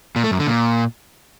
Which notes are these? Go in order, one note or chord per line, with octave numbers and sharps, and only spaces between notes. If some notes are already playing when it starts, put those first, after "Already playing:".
A#2
A3
F#2
D3
A#2